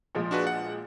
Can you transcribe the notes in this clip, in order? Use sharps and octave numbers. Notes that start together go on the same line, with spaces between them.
A#2 F3 G#3
D4 F#4 B4
F#5